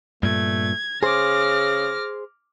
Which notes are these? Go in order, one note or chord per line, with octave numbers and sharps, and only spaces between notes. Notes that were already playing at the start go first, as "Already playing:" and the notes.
G2 A#2 A3 G#6
C#3 G#4 C5 D6 F6 A#6